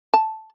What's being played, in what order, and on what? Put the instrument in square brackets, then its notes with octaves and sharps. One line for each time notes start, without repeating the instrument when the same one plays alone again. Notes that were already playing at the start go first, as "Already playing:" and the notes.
[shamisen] A5